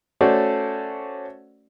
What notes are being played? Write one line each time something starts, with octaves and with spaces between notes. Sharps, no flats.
A3 C#4 F#4 C5 D5